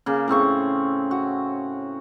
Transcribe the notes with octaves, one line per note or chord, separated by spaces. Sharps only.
C#3 A#3
A2 C#3 C4 C#6
F#4